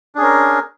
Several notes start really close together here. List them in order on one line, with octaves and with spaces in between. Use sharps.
D4 G#4 C#4 A#4